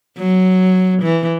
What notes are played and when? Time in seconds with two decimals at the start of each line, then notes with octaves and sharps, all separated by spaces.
0.18 F#3
1.02 E3